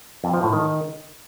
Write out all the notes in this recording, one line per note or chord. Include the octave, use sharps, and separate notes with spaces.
F2
F3
A2
D#3